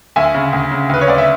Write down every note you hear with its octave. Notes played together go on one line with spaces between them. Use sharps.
D2 E5 G#5
C#3
D2
C#3
D2 B4
C#5
D2 D5
E5